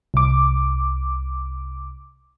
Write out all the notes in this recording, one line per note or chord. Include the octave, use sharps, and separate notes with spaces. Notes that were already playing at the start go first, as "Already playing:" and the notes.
C2 D6